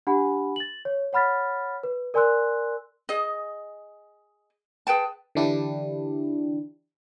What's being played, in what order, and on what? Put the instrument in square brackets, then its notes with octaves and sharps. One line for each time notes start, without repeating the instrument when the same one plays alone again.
[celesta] D4 G4 F#5 G#5 B5
A6 F#7
C#5
C#5 F#5 B5 F6 A6 B6
B4
A#4 D5 G#5 C6 E6 F#6
[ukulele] G#4 D#5
G#4 B4 G5 A5
[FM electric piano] D3 E3 D4 E4 G4